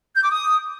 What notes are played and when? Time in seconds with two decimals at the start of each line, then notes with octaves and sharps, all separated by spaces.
0.15 G6
0.23 D6
0.30 D#6